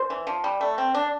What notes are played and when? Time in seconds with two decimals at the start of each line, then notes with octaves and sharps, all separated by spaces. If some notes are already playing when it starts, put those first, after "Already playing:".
Already playing: C5
0.10 E3
0.27 F3
0.44 G3
0.61 A3
0.78 C4
0.94 D4